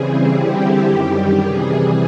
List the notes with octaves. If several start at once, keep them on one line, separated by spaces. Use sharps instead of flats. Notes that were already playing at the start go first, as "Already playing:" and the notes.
Already playing: C#3 E3 G3 C4 G#4
D3 G3 C4 E4 G4
F#2 D#3 G3
C3 E3 G3 G#4